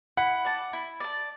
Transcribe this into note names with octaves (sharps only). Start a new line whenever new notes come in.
E4 F#5
D5 A5
E4
D5 A5